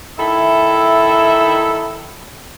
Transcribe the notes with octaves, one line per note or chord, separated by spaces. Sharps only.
D#3 E4 A4 E5